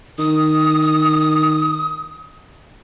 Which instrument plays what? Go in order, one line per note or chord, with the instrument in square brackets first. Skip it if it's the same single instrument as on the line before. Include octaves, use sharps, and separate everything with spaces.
[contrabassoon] D#3 [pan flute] D#6